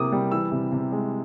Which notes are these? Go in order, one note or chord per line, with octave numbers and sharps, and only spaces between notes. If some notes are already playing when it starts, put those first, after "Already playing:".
Already playing: C3 E3 F#3 A#3 D6 D#6
G3
E3 E6
C3
C3
G#3